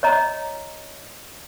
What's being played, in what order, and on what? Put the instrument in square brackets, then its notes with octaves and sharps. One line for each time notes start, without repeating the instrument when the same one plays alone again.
[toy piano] C#5 D#5 A#5